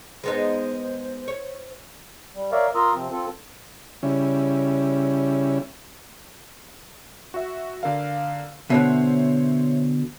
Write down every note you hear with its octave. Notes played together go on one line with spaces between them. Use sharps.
G#3 B3 D#4 C5
C#5
G3
A#4 C#5 D5 E5 F5
F4 A#4 A#5 C6 D#6 E6
C3 F3 C4
C4 F4 A4
C#3 G3 C#4 E4
F#4 E5
D3 A#4 F5
B2 D3 C5 C#5 E5